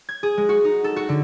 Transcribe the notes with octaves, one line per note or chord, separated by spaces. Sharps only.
G#6
G#4
G#3
F#4
D#4
A4
F#4
D3